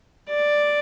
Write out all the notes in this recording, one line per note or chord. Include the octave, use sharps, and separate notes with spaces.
D5